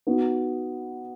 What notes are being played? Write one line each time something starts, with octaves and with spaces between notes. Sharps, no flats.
B3 D#4 F#4